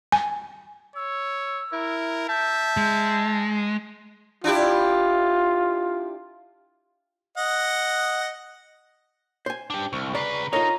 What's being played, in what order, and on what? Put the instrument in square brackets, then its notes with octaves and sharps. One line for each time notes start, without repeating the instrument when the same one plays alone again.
[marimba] G#5
[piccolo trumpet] C#5 [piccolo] E6
[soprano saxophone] E4 [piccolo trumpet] A#4
[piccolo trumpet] E5 [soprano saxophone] A5 [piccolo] G6
[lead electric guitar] G#3
[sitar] D4 E4 G4 [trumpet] F4
[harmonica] D#5 F#5
[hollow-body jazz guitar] C5 G#5
[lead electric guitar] D4 G4
[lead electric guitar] C2 [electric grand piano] C#6
[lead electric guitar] C#3 B4 [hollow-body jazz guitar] D5 [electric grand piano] A#5 C#6 C7
[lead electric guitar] D#4 [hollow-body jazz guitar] F4 C#5 [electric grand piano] A4 A#4 D#5 [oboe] A#5